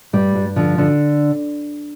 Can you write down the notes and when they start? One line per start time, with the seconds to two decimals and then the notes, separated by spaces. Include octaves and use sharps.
0.13 G2 G3
0.35 G2
0.56 D3 F3
0.78 D3